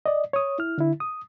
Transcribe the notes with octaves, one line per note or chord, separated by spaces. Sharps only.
D5 D#5
C#5 D#6
E4 F6
D3 E4
D#6